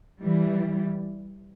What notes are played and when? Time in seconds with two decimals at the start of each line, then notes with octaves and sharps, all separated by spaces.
0.21 E3 G3